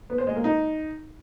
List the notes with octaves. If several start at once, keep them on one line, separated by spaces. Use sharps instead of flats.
B3
C5
G#3
A#3
D#4